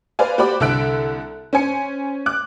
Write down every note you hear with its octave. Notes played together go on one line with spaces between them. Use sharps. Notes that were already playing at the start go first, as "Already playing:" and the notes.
B4 C5 D5 F5 G#5
F#4 G4 C5 D5 B5 D6
C2 D3 A4 E5 F#6 D7
C#4 C5 G#5 C#7
D6 F#6